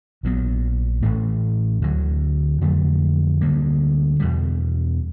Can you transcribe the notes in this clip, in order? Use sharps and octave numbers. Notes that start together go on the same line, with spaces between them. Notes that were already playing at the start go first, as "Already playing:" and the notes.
A#1 A#2 F#3 B3
A1 A2 E3 A3
D2 D3 F#3
F2 D3 F#3 A3
D2 D3 G3 A#3
E2 B2 G3